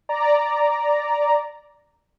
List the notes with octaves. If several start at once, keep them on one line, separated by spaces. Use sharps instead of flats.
D5 A#5